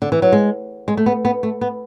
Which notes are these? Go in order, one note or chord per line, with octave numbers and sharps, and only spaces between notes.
D3
E3
F#3
G#3
G#3
A3
B3
B3
A3
B3